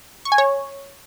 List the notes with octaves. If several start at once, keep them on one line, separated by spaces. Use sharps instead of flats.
C#6
G#5
C#5